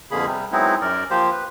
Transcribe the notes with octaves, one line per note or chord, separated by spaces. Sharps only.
F2 B2 D3 A#3 G#4 B5
C3 G3
F#3 G#3 B3 C4 D#4 E4
F#2 A#4 D5
F3 A#3 G4 C5
B4